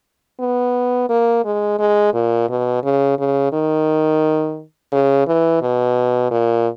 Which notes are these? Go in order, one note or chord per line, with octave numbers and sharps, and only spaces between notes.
B3
A#3
G#3
G#3
A#2
B2
C#3
C#3
D#3
C#3
E3
B2
A#2